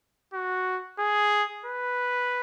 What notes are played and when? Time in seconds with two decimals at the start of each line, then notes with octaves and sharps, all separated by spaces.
0.33 F#4
0.99 G#4
1.66 B4